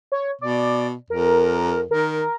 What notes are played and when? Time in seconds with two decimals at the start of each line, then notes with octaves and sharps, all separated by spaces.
0.12 C#5
0.41 B2 D5
1.10 F2 A#4
1.91 D#3 A#4